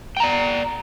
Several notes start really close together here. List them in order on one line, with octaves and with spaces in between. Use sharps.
G5 A#5 D5